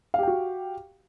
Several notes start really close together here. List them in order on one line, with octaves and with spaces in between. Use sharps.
F5 G4 G5 F#4